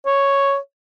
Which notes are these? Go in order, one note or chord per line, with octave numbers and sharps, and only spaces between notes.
C#5